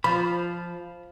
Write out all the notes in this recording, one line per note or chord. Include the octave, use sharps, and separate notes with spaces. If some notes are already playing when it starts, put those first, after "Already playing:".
F3 B5